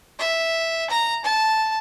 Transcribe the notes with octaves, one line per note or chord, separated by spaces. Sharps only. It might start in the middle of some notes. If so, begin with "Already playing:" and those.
E5
A#5
A5